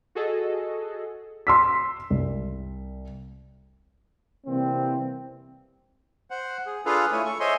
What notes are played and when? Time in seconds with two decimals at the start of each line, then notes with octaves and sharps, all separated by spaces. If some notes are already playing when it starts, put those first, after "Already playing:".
0.15 F#4 G#4 A4 D#5
1.47 C6 E6 B6
2.10 C2
4.46 C3 E3 G3 A#3 C4
6.31 C5 F#5
6.66 G#4
6.86 D4 F4 G#4 A4 B4 F5
7.12 A3 E4 C#5 G#5
7.26 A4 C#6
7.40 C5 C#5 D#5 E5 G#5 C6